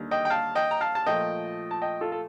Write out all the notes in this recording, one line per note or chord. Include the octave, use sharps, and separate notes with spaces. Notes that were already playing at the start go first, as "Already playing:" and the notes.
Already playing: D#2 D3 G3
D#5 G5
G5
F5 A5
D#5 G5
A#5
F5 A5
A5
A#2 F3 A3 D#5 G5
A5
D#5 G5
F4 A4
A4